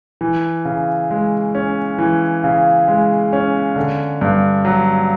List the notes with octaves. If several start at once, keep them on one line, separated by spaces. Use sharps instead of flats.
E3
C#3
G#3
C#4
E3
C#3
G#3
C#4
D3
G2
F#3